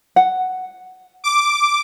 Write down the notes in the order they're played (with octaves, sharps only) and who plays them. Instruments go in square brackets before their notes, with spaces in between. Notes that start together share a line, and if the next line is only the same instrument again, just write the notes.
[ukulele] F#5
[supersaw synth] D6